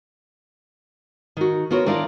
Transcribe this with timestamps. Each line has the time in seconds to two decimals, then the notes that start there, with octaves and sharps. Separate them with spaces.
1.37 D#3 F#4
1.71 B3 F4 F#4 A#4 C#5
1.86 D#3 D4 E4 F4 A#4 D5